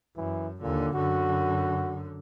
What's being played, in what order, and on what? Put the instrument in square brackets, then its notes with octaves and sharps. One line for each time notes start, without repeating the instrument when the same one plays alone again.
[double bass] F#2 [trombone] E3
[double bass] D#2 D3 [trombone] A#2
[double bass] F#2 D3 [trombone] F#4